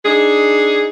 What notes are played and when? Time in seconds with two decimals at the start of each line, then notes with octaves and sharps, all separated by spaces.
0.06 D4 D#4 G#4